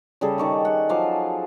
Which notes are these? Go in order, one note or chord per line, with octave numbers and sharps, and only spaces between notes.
C#3 G3 G#4 A4
D#3 C#6 D6
F#5
F3 F#3 F5 D6